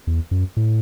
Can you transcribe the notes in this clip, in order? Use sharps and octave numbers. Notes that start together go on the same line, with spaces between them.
E2
F#2
A2